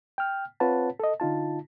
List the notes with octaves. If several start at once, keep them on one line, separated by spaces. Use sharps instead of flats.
G5 F6
C4 F4 B4 C#5 F#5 A5
A4 D#5
D3 D#4 F4 A5